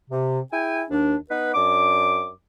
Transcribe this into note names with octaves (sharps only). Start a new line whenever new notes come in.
C3
E4 G#4 G5 G#5
D#2 D4
B3 D#4 B4
F#2 D4 D6